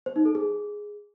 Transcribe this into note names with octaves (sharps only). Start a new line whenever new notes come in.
C5
D#4
A4
G#4